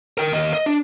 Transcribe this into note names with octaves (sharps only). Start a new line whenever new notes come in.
A#4 G5
D#2 D#5
D#5
D4